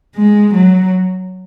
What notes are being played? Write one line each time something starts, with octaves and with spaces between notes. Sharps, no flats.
G#3
F#3